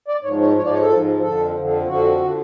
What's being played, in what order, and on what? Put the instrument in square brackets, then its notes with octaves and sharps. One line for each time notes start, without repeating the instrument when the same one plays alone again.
[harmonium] D5
G#2 F3 C#5
C#5
G#2 C#5
F3 D5
C#5
A4
G#2 F3
F2 D3 F3 A4
F2 D3 F3
F2 D3 F3 F#4
D3 F3